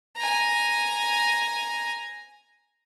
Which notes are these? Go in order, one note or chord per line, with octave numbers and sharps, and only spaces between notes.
G#5 A#5